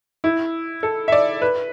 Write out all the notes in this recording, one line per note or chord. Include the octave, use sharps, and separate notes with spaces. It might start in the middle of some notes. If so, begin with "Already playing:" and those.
E4
A4
E5
D5
B4